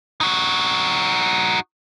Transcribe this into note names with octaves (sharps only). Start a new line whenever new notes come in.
D#4 F#4